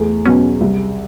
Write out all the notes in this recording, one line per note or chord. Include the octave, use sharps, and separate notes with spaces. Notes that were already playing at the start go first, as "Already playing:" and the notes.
Already playing: E2 A3
B2 F#3 B3 C#4
C2